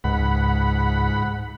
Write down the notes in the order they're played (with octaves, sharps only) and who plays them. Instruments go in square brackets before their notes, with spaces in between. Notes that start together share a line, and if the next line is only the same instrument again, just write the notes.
[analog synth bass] C#2 [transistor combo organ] G#2 F#5 B5